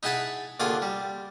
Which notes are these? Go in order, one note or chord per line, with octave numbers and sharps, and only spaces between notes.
D#4 E4 G#4 F#5 A5 B5
D#2 D3 F4 G#4 F#5 D6
G3